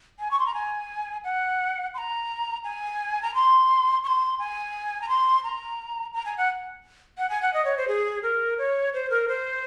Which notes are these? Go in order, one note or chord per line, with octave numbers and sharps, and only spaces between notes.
G#5
C#6
C6
A#5
G#5
F#5
C6
A#5
G#5
A#5
C6
C#6
C6
G#5
A#5
C6
A#5
A#5
G#5
F#5
F#5
G#5
F#5
D#5
C#5
C5
G#4
A#4
C#5
C5
A#4
C5